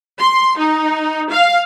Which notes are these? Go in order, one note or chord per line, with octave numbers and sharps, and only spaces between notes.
C6
D#4
F5